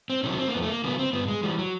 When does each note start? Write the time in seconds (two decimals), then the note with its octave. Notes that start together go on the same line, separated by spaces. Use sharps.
0.10 C4
0.24 C3 D#3 F#3 C#4
0.39 C4
0.48 A#3
0.54 F2 B3
0.63 A3
0.68 A#3
0.84 C#3 F#3 B3
0.99 C4
1.13 G2 B3
1.28 G#3
1.43 E3 G3
1.59 F#3